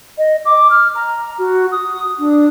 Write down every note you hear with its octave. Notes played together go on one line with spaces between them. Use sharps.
D#5
D6
F6
A#5
F#4
D#6
D4